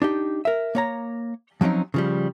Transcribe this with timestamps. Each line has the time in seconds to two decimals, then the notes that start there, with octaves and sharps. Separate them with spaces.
0.02 D4 D#4 G4
0.45 A#4 E5
0.75 A#3 C#5 A#5
1.61 F3 F#3 C4 C#4 D#4
1.94 C#3 F3 G3